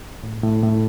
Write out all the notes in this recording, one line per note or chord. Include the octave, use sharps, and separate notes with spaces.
A2
A2
A2